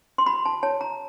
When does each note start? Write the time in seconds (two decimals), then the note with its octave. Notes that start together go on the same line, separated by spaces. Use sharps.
0.18 C6
0.26 F#4 B5
0.46 A5
0.63 C#5 A5
0.81 A#5